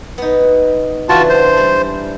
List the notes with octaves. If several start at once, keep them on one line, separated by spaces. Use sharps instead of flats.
B3 D#4
C#3 E3 D4 F4 F#4 A5
C5
G3